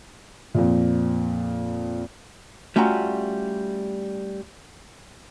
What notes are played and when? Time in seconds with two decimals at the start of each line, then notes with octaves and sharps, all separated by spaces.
0.54 F2 A#2
2.76 G3 A3 C#4 F4 F#4 A#5